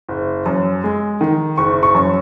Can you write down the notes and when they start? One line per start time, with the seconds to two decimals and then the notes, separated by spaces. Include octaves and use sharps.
0.08 F#1
0.46 F#2
0.84 G#3
1.21 D#3
1.57 F#1 C#6
1.83 C#6
1.95 F#2